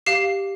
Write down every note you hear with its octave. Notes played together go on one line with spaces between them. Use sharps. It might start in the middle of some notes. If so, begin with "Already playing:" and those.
G4 F5 C7